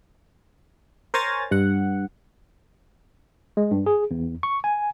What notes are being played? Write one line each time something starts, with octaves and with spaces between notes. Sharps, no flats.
A#4 C5 C#5 G#5 A#5 A6
G2 F#5
G#3
G2
G#4
E2
C#6
G#5